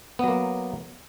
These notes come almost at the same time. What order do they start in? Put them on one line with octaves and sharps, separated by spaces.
B3 F#3 A#3